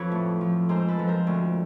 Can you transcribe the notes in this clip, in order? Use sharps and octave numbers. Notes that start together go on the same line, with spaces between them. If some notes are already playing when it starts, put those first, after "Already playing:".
Already playing: F2 F3 A4 B4 C#5
A2
F3
G#2 A#4 C5
A4 B4
F3
A#4 C5
D2